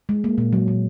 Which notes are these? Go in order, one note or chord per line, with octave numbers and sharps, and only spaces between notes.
G#3
A#3
A#2
F#3
A#2